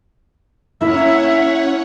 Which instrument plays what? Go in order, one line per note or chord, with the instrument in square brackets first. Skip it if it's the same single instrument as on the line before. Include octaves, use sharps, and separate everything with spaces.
[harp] A#3 E4 [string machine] C#4 C#5 F#5 [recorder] E5